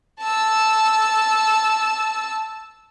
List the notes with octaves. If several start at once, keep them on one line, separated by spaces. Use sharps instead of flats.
A5 E6